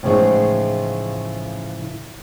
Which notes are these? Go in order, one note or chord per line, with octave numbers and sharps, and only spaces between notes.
A2 C#3 E3 F3 G#3 D#4